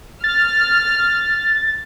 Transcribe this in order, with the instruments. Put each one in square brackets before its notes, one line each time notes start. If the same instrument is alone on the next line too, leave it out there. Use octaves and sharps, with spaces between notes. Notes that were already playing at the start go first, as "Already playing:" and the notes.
[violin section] F6 [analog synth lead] A6